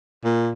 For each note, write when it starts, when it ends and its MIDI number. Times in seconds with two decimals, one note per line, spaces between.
0.24 0.52 46